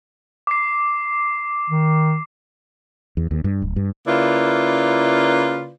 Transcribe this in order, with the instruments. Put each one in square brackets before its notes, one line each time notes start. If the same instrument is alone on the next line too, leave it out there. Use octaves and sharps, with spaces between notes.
[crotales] D6 C7
[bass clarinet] D#3
[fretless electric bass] E2
D#2
G2
D1
G2
[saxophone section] C#3 A#3 E4 F4 B4 D5